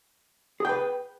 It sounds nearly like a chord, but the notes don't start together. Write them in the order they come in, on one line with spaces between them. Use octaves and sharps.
G#4 G5 B4